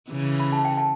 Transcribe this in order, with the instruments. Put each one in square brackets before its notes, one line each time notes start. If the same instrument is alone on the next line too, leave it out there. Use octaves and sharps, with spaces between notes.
[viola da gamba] C#3 E3
[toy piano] B5
A5
G5
A5